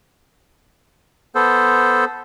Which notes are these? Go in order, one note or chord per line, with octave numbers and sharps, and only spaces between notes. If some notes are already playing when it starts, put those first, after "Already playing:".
B3 A4 C5